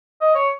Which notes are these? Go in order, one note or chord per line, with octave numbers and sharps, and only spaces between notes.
D#5
C#5